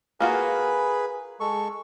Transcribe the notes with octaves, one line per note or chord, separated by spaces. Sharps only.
A#3 F4 F#4 G#4 B4 B5
G#3 A4 C#6